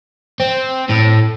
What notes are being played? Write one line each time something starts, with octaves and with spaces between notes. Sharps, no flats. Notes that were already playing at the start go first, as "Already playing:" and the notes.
C4
A2